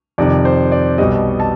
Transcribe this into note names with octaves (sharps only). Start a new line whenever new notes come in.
F2 C3 D#3 D5
C5
D5
B1 B2 G3 D#5
A5